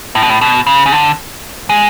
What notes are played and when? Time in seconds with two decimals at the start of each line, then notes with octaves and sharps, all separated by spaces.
0.15 A2
0.22 B2
0.30 A2
0.41 B2
0.67 C#3
0.86 C#3
0.92 D3
1.69 G#3